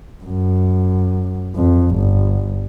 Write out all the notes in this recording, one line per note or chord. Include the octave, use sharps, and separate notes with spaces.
F#2
F2
G1